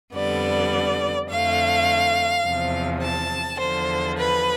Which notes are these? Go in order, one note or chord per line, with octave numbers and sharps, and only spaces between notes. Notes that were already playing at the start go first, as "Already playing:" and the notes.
F2 D3 G3 B3 D5
F2 D3 A3 F5
E2 C3 F3
A5
E2 D3 F3 C5
B4